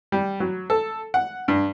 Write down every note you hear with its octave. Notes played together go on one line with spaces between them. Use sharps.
G3
F#3
A4
F#5
G2